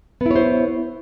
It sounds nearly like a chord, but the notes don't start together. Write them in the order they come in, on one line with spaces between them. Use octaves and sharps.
B3 E4 C#5 C5